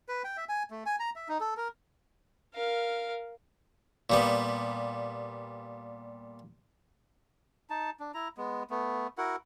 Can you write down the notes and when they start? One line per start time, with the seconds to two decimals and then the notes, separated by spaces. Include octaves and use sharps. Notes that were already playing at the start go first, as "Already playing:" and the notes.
0.08 B4
0.24 G5
0.37 E5
0.49 G#5
0.71 A3
0.86 G#5
1.00 A#5
1.16 E5
1.28 D#4
1.40 A4
1.57 A#4
2.55 A#4 F5
4.10 A#2 G3 B3
7.70 D#4 A5
8.00 D4
8.14 E4 A#5
8.37 G#3 B3
8.70 A3 B3
9.18 E4 F#4 A#4 F#5